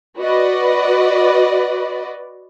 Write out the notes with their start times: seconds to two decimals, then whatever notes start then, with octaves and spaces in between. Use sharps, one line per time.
0.18 F#4 B4 D5 D#5